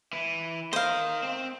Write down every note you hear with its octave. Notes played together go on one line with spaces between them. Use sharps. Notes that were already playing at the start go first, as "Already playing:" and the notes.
E3
A#4 C5 D#5 F5
C4